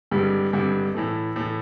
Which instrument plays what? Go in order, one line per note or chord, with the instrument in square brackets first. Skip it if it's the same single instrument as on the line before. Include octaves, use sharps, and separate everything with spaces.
[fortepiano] G#1 G2 D3 G3
G#1 G2 D3 G3
A2 E3 A3
A2 E3 A3